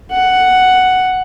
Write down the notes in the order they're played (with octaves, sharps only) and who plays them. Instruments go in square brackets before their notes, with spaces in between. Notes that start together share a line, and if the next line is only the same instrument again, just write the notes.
[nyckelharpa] F#5